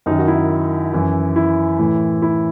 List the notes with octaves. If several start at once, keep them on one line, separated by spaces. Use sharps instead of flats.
F#2 D#3 D#4
F#4
E4
F#2 E3
E4
A2 E3
E4